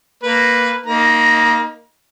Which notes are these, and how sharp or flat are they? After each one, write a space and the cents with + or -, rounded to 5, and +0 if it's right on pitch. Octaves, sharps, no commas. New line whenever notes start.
A#3 +0 B4 +0
A#3 +0 D#4 +0 A#5 +40